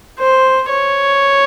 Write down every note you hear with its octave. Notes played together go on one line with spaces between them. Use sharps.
C5
C#5